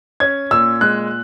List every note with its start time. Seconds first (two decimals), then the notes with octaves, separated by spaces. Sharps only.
0.20 C#4 G#6
0.51 A#2 E6
0.81 G#3 F#6